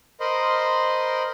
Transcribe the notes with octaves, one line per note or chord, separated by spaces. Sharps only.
A#4 C5 D#5 B5 C6